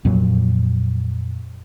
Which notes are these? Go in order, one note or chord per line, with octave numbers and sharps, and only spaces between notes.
F2 A#2 F#3